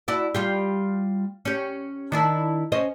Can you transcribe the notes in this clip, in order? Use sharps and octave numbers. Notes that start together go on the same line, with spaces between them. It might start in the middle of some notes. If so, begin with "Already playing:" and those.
E4 F#4 D5
G3 F4 G4
C#4 G4
D#3 D4 E4
C#4 C5 D#5